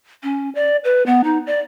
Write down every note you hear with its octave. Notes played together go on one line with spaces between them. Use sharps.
C#4
D5
B4
B3
D#4
D5